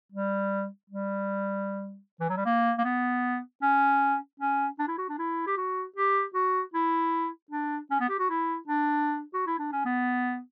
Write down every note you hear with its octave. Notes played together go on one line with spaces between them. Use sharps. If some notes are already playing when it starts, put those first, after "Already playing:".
G3
G3
E3
F#3
G3
A#3
A#3
B3
C#4
C#4
D4
E4
F#4
D4
E4
G4
F#4
G4
F#4
E4
D4
C#4
B3
G4
F#4
E4
D4
F#4
E4
D4
C#4
B3